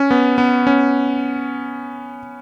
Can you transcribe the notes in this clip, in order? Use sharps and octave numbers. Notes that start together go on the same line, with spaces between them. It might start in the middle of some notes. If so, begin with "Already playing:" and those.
Already playing: C#4
B3
B3
C#4